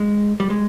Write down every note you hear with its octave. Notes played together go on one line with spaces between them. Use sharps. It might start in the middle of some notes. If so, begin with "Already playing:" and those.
Already playing: G#3
G3
G#3